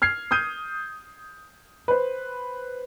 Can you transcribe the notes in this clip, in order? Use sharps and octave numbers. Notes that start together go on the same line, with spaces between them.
F6 G#6 C7
D#6 F6 G6 D#7
B4 C5